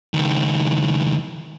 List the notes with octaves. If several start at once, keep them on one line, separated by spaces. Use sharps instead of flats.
C#2 D#3